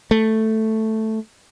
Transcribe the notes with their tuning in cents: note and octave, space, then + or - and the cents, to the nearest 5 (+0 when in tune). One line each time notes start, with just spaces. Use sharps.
A3 +0